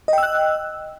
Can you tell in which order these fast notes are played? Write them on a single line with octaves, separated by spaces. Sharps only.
D#5 G5 E6 F#6